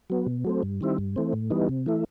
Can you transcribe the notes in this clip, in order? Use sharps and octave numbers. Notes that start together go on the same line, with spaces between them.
F#3 B3
B2
F#3 A3 C4
G2
D#3 G3 C4 E4
G2
E3 A3 C4
A2
E3 G3 B3 D#4
C3
E3 A3 E4